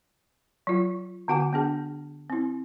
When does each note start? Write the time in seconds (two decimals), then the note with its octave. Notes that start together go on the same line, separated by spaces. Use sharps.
0.67 F#3 F4
1.28 D3 B3 F#4 F#5 G#5 D6
1.53 B3 D4 G#4
2.30 C4 E4